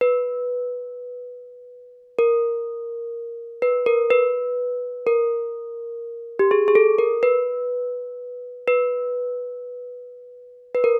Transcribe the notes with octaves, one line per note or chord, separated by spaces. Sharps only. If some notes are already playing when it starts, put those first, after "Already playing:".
B4
A#4
B4
A#4
B4
A#4
G4
G#4
G#4
A4
A#4
B4
B4
B4
A#4